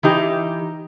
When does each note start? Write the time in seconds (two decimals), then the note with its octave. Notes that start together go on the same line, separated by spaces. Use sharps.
0.03 E3 D#4 G4